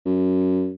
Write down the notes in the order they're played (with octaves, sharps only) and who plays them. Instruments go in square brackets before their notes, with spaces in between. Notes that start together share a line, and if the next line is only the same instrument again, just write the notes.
[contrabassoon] F#2